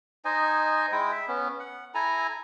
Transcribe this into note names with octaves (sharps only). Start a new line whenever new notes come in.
D#4 C5 D#5 G#5
G#3 E4 G5
E5
B3 C#4
F#5
E4 A4 G#5 A#5